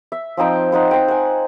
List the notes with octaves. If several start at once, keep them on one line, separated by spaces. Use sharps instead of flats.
E5
F3 C4 D#4 G5
D#4 F#5 C6
C5 G5
F#5 G#5